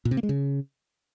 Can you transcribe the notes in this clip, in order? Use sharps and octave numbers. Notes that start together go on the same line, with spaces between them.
A#2
C3
A#3
G#3
C#3